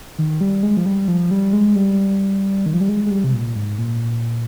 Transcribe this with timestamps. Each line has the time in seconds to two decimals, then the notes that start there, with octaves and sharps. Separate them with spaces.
0.18 D#3
0.41 G3
0.63 G#3
0.77 F3
0.86 G3
1.08 F3
1.31 G3
1.53 G#3
1.76 G3
2.66 D#3
2.74 F3
2.81 G3
2.89 G#3
3.06 G#3
3.11 G3
3.24 C3
3.34 A#2
3.56 G#2
3.78 A#2